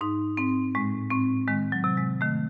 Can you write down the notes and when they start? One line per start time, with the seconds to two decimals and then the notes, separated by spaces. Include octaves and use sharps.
0.01 G#2 D#4
0.37 G#2 C4
0.75 A2 G#3
1.10 A2 C4
1.48 D#3 G#3
1.72 F#3
1.84 C3
1.97 G#3
2.21 D#3 A3